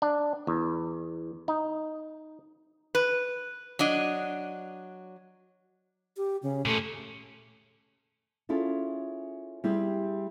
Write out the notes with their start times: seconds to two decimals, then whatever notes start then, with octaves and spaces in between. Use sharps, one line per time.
0.02 D4
0.47 E2
1.48 D#4
2.95 B4
3.79 F#3 D4 D#5
6.17 G4
6.42 C#3
6.65 A#2 A3 C#4
8.49 C#4 E4 F4 G#4 A4
9.64 G3 C4 E4 G4 G#4